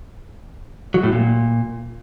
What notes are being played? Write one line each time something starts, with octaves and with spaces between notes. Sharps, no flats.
F#3
A2
A#2